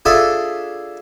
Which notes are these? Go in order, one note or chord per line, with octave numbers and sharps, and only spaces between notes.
D4 F4 G#4 A4 D5 E5